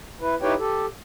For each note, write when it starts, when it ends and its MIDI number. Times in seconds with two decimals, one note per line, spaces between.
0.21 0.35 64
0.21 0.35 71
0.42 0.54 63
0.42 0.54 64
0.42 0.54 67
0.42 0.54 71
0.42 0.54 73
0.42 0.54 79
0.59 0.86 67
0.59 0.86 69